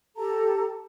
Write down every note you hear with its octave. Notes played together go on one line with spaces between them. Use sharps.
G4 A4 A5 A#5